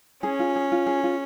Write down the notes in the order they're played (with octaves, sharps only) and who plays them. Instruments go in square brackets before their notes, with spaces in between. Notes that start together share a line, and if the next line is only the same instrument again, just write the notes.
[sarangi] C#4 [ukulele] G#4
[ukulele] F4
G#4
F4
G#4
F4